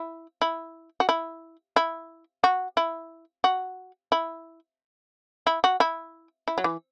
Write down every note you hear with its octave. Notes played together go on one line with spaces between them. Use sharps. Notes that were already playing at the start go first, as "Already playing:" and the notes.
Already playing: E4
E4
F#4
E4
E4
F#4
E4
F#4
E4
E4
F#4
E4
E4
F#3
E3